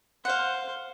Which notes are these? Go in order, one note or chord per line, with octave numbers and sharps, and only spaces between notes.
C5 F5 F#5